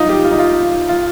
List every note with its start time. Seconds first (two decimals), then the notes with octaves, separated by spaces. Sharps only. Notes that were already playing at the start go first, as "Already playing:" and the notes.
Already playing: D#4 F4
0.09 G4
0.24 F4
0.31 D#4
0.39 F4
0.89 F4